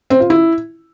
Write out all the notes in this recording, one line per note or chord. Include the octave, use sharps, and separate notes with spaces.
C4
F4
E4